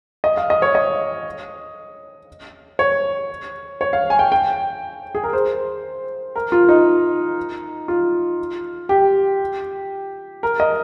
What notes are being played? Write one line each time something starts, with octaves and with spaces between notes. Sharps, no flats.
D#5
F5
D#5
C#5
D#5
C#5
C#5
F5
G#5
G5
G5
G#4
A#4
C5
A#4
F4
D#4
F4
G4
A#4
D#5